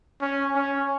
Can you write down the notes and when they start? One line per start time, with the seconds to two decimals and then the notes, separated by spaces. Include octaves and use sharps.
0.21 C#4
0.55 C#4